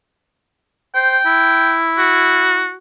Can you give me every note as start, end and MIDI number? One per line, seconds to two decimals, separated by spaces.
0.95 1.18 72
0.95 1.76 79
1.26 2.72 64
1.98 2.75 66